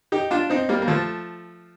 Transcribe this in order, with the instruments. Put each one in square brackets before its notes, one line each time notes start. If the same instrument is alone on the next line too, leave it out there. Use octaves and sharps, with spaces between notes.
[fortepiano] D#4 G4
D4 F4
C4 D#4
G3 A#3
A#3
F3 A3